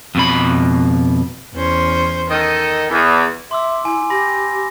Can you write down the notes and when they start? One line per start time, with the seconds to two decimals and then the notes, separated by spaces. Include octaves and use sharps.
0.15 F2 B2 B5
1.54 E2 C#4 C5
2.31 D#3 A4 D#5
2.90 E2
3.51 E5 C6 D6 E6
3.85 E4 G#5
4.10 G4 B5 A#6